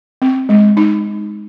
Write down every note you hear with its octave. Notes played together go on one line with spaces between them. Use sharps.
C4
G#3
D#4